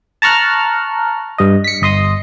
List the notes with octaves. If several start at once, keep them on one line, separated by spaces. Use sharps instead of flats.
A5 A#5 C#6 F6 F#6
G2 D#5
B6 C#7
G1 D#5 C6 D#6